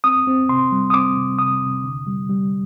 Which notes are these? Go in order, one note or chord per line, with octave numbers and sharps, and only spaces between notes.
C4 D#6
C4
C3 C6
G3
D#6
C4 D6
C3
C3 D#6
C3
D3
G3
G3